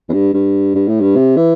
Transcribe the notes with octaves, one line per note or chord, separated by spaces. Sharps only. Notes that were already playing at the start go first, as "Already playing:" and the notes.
E2
G2
G2
G2
A2
G2
C3
E3